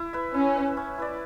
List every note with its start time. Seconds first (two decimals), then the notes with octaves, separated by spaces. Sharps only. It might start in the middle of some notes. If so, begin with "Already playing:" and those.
Already playing: E4
0.13 B4 E5
0.34 C#4 E4
0.56 B4 E5
0.77 C#4
0.98 E4 B4 D5